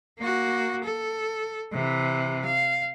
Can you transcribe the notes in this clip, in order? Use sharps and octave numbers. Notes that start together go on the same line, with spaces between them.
A#3 F#4
A4
C3 E3
F5